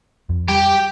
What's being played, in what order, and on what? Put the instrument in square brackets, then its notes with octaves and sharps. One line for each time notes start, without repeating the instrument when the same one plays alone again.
[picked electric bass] F2
[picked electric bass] G3 [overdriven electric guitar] G4 G5